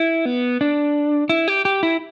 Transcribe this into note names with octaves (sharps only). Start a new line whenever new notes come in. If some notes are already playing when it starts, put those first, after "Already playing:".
Already playing: E4
B3
D4
E4
G4
G4
E4